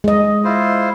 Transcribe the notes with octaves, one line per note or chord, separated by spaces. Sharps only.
G#3 D#5
E4 F4 C5